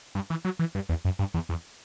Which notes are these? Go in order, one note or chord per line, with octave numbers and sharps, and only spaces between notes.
G2
E3
F#3
E3
G2
E2
F#2
G2
E2
E2